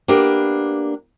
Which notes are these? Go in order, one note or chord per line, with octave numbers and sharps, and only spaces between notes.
A#3 B3 D4 G4